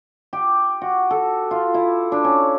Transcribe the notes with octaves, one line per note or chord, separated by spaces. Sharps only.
G4
F#4
A4
F4
E4
D4
C#4